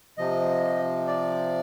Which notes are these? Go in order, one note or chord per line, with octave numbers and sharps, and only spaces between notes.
C3 F3 D#5
D5